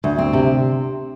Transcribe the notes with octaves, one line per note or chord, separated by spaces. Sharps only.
D2
C4
C3